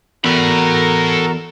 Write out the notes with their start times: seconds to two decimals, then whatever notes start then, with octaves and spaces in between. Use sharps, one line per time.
0.24 E2 F#4 A4 A#4 A#5 B5